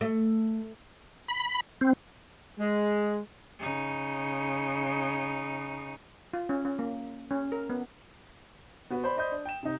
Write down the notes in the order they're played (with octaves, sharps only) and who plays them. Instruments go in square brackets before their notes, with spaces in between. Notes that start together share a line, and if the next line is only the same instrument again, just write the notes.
[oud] A3
[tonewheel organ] B5
C4
[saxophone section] G#3
[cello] C#3 D#4
[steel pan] F4
C#4
C#4
A#3
C#4
A#4
B3
[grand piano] B3 F#4 B4
C5 D5 B5
C5 D5 D#5 B5 D#6 G6
D4
G5 E7
C3 D#4